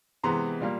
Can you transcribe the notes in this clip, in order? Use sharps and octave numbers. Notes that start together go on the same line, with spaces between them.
C3 E3 G#3 B3 A#5 C6
A#2 G3 A#3